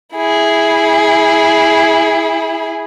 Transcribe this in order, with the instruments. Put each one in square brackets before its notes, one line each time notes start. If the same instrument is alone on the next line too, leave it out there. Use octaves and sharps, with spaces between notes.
[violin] E4 G#4